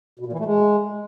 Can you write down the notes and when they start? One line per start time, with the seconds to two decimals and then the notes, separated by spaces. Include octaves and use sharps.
0.19 B2
0.26 A#2
0.32 E3
0.39 A3
0.46 G#3